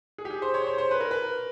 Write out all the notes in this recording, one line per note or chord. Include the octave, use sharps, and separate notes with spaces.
G#4
G4
G#4
C5
C#5
C5
C#5
C5
B4
A#4
B4